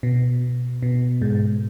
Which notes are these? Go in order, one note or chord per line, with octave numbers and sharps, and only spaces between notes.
B2
B2
G#2